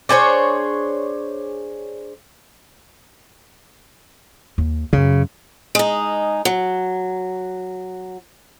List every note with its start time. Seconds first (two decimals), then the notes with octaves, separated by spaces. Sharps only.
0.09 D4 G#4 C5 C#5
4.58 D#2
4.93 F#2 C#3 F#3
5.75 G#3 D#4
6.45 F#3